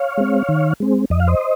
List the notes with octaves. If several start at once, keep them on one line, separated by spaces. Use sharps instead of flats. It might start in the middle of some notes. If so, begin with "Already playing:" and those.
Already playing: C#5 F5
G#3 C4
D#3
G#3 C4
F2 D#5
F5
C5 D#5